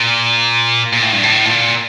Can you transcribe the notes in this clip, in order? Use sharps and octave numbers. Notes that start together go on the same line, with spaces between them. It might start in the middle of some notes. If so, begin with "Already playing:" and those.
Already playing: A#2
A#2
A2
G2
A2
A#2